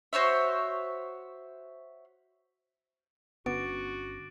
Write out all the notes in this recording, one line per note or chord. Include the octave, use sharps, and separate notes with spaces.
F#4 C5 C#5 E5
G1 D3 B3 C#4 F#4 D6 A6 D7